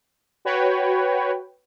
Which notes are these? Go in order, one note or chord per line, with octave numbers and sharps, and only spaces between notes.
F#4 B4 C#5 G5